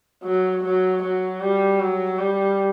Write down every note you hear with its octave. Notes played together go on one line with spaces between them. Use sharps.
F#3
F#3
F#3
G3
F#3
G3